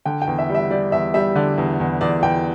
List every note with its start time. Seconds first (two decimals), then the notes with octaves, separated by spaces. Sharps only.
0.06 D3 G5
0.22 G5
0.28 E2
0.39 E5
0.49 G3
0.55 E5
0.70 G3 D5
0.92 E2 E5
1.14 G3 E5
1.36 D3 D5
1.58 E2
1.80 E2
2.01 E2 D5
2.23 E2 G5